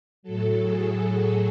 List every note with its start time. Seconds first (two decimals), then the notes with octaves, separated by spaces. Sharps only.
0.23 A2 F#3 A4
0.60 G#4
0.98 G#4